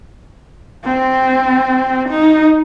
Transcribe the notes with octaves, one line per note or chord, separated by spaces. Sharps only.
C4
D#4